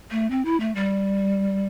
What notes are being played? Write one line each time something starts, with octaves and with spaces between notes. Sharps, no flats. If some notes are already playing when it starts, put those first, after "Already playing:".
A3
C4
E4
A3
G3